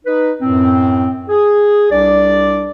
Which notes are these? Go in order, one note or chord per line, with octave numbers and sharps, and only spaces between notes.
D#4 B4
F#2 A2 C4
G#4
C2 D4 D5